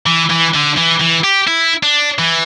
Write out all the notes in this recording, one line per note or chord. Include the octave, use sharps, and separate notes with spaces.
E3
E3
D3
E3
E3
G4
E4
D4
E3